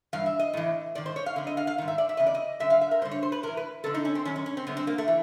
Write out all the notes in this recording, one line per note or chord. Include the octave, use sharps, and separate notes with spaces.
G2 E3 F5
E5
D#5
A2 E3
G#2 D#3 D5
C5
C#5
F5
F2 D3
D#5
F5
F5
G#2 D#3
E5
D5
E5
E2 C#3 D#5
D5
D#5
F#2 D3 E5
F5
E5
A#4
G2 D3 C5
C#5
C5
B4
A2 E3 A#4
B4
F2 D3 A4
D#4
C#4
C4
F#2 D#3 C#4
C#4
C#4
C4
F#2 D3 B3
C4
A#3
A3
E3